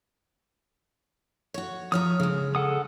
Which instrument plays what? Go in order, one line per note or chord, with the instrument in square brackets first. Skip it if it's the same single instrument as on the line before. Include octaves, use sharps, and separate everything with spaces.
[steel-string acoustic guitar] F#4 C#5
[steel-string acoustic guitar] F3 C#5 A#5 [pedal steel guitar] D#6 F6
[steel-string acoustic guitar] C#3 G#3
[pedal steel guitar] A4 F#5 D#6